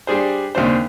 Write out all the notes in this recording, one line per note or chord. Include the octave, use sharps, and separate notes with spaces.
G3 D4 G#4 C5
D#2 C#3 C4 D4 C5